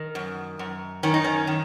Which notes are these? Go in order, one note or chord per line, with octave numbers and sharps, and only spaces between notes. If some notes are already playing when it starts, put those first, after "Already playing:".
Already playing: D#3
F#2
F#2
D#3 C#4
D#4
C#4
D#3